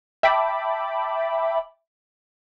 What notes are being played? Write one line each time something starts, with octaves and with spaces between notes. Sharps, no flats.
E5 G5 A5 B5 D6